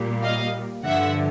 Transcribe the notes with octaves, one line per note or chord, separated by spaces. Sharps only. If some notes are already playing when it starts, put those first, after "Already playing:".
Already playing: A#2 G3 A#3
D#5 F5
G2 D3 F3 E5 F#5